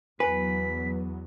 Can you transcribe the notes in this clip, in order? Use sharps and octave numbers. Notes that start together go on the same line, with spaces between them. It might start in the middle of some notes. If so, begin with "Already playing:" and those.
E2 F#3 B3 B4 G#5 B6